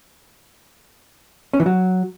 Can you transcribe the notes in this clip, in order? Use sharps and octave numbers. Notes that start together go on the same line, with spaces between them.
C#4
E3
F#3